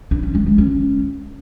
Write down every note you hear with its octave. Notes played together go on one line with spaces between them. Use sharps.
D4
C#4
G#3
D3
C#4